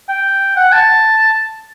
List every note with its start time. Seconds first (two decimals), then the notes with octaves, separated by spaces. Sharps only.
0.09 G5
0.56 F#5
0.72 A5